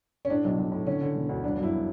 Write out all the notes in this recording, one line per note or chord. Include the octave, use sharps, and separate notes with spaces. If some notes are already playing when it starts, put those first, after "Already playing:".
C#4
A2 D4
B1
B1
A2
D3 C#4
D3
E1
D2
G1 D4
F#2
E4